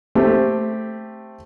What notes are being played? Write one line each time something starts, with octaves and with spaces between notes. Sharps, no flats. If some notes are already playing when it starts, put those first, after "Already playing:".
A3 C4 G4